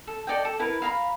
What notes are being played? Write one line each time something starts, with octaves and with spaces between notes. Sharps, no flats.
A4
A4 D5 D#5 G5
A4
E4 A#4 B4
F5 A#5 B5